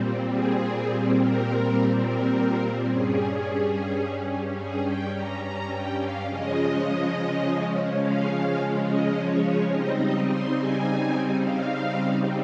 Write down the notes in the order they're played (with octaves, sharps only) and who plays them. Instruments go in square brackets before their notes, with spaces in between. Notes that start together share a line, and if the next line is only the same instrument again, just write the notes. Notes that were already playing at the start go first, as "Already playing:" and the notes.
Already playing: [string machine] A#2 G3 C4
G#4
A#4
A#4
G2 G3 C#4 G#4
G#4
G5
A#5
A#5
G5
F5
C#3 F3 G#3 C#4 D#5
F5
D#5
C#5
C#3 G3 C4 D#4 D#5
D#5
C6
G#5
F5